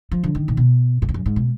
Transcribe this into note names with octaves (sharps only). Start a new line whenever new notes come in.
F3
D3
D#3
A#2
B2
G#2
F2
F#2
G#2
B2